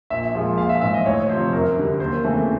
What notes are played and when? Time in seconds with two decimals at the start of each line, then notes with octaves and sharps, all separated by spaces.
0.10 A#1 E5
0.34 A#2 F3 G#3
0.58 A#1 F5
0.69 E5
0.81 G#2 E3 E5
0.94 D#5
1.05 D2 C#5
1.29 C3 F3 C5
1.52 F#2 A#4
1.76 D3 G3
2.00 D#2 C5
2.24 C#3 E3 A3 C4